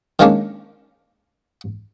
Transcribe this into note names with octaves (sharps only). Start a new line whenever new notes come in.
D#3 F3 G#3 A#3 C#4 D4